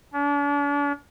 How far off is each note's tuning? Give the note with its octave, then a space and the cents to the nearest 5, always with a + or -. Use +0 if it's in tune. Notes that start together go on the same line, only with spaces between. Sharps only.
D4 -40